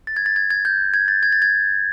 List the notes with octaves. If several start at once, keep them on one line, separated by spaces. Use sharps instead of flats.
A6
G#6
A6
G#6
G#6
G6
G#6
A6
G#6
A6
G#6